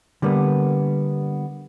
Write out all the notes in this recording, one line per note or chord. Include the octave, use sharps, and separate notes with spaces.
D3 G3 A#3 B3